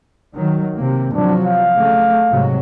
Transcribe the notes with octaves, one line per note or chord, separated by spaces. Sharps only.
D#3 F#3
C3 A#3
C3 F3 F#3 D4
F5
C#3 A3
G#2 C3 F#3